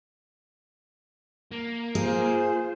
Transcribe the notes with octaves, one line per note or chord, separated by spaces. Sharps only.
A#3
F4 G#4 C5